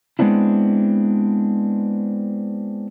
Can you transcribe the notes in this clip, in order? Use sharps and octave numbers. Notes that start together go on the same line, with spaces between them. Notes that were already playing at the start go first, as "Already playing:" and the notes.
G#3 B3 C4 D4 E4